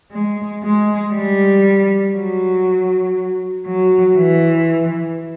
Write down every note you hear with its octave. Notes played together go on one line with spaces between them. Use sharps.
G#3
G#3
G3
F#3
F#3
E3